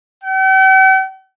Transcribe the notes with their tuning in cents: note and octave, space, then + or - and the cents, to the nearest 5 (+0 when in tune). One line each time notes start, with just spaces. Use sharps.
G5 -45